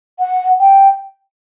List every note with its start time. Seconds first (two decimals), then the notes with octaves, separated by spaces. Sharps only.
0.19 F#5
0.60 G5